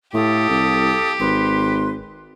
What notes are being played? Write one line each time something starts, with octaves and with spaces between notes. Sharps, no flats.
A2 G4 A4 F5 D#6
C2
G#1 B4 C6